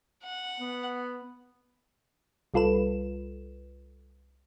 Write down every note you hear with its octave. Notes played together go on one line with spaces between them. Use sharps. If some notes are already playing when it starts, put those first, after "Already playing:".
F#5
B3
C2 G3 F4 A4 B4 E7